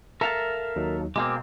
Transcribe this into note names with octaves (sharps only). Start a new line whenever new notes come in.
A4 A#4 E5 F5 A5 A#5
D#2 F#3 D#4
B2 G#3 A#3 C4 D6